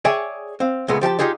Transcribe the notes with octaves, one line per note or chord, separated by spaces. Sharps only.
G#4 C#5 D5 E5 G5 G#5
C4 F5
C#2 A#2 G#3 A3 B3
F3 G4 F5 A5
D#4 F4 G4 G#4 D5